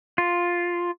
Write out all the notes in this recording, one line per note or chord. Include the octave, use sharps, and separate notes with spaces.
F4